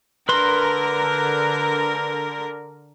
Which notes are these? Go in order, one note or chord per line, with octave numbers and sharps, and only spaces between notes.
D3 A#4 B4 C6